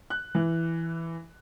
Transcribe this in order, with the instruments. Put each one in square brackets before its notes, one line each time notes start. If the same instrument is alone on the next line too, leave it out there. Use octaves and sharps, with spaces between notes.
[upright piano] F#6
E3